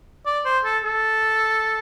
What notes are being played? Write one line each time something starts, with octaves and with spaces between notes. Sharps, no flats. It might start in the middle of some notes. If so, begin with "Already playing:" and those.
D5
C5
A4
A4